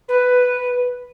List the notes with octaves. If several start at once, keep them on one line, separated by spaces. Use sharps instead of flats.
B4